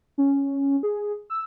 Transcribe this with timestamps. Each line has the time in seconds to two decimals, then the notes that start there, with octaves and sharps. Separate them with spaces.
0.18 C#4
0.83 G#4
1.30 E6